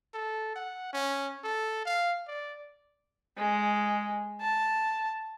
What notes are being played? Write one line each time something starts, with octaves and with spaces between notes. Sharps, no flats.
A4
F#5
C#4
A4
F5
D5
G#3
A5